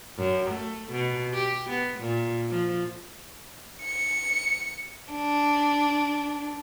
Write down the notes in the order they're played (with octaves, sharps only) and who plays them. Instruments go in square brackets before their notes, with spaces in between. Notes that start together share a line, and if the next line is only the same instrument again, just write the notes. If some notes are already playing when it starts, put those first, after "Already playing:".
[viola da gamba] F#2
A3
B2
G4
B3
A#2
F3
[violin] C#7
D4